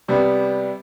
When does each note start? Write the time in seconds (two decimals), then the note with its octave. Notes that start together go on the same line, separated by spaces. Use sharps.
0.08 C3 G3 B3